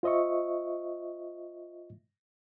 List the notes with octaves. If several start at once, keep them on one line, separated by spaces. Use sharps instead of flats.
F4 C5 D#5 E5 C#6